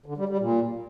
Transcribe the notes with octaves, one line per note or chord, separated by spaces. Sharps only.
D3
G3
G3
A#2